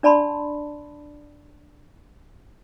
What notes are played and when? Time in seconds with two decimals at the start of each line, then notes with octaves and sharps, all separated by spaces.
0.03 D4 D5 A5 B5 C6